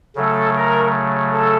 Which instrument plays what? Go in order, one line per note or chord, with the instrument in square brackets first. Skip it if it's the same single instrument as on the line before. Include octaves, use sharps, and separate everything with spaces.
[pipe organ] C#3 F#3 A3 [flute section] A4
[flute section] A#4
A4